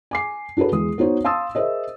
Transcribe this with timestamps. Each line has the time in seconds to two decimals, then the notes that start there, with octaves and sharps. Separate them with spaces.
0.11 G#5 D6 C7
0.57 D4 F#4 G#4 A4 B4
0.71 E2 G#3 D#6
0.98 B3 D#4 F#4 C5 C#5
1.24 F5 A5 C6 D#6 E6 A6
1.55 G#4 A#4 C5 D#5 E5